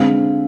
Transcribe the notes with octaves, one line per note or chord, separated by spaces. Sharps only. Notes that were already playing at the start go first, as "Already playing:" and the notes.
Already playing: D3 G#3 C4 F5